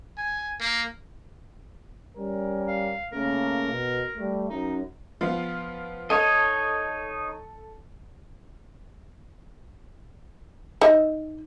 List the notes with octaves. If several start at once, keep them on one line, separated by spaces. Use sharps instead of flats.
G#5
A#3
G3 C#4 A#4
F5
C#3 A3 A#3 A#4
B2
G3 A3
F#2 D#4
F3 B3 F4
D#4 A4 C#5 D#5
D#4 E5